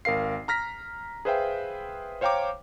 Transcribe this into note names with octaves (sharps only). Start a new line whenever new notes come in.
G#1 A#4 F5 C7
A#5 F6 A#6 B6
G#4 B4 C5 E5 F5 G5
C5 C#5 F5 G5 A#5 D6